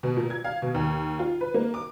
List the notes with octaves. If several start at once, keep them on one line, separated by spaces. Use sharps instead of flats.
B2
A#2
G#6
F5
B2
D#2
F4
B4
A#3
D6